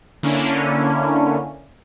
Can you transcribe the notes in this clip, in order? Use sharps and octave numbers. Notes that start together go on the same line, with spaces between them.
D3 A#3 C#4 D4 E4